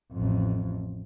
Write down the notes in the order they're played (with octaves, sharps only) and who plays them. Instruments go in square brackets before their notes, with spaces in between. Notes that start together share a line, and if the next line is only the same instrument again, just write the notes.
[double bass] A1 F2